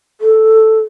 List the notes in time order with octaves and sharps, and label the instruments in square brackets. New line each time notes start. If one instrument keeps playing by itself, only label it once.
[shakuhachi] A4